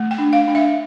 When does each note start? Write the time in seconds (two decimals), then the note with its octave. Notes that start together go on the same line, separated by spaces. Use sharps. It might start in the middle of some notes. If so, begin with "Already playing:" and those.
Already playing: A3
0.11 G5
0.18 D4
0.33 F5
0.48 D4
0.55 E5